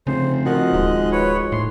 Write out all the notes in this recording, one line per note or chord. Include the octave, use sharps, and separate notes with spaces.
F1 C#3 C5
D#3 F3 F#4 D#5 F#6
D1 G#2
B4 C#5
A2 C6